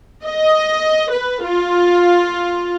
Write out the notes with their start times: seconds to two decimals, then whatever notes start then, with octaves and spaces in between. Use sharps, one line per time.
0.25 D#5
1.12 B4
1.44 F4